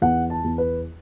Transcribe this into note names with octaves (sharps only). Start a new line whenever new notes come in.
E2 F#5
A5
E2
B4